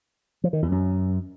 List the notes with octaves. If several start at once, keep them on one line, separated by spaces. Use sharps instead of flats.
F3
D#3
E2
F#2